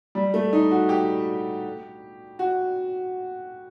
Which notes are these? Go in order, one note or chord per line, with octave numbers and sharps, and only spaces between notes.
G3
A3
D#4
F#4
G4
F#4